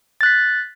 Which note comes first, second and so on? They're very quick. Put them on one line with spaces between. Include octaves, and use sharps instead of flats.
A6 F#6 B6